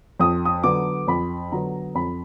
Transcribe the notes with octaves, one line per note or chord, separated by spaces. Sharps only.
F2 D#6
D#6
D3 F#3 B3 D6
F2 B5
D3 F#3 B3 A#5
F2 B5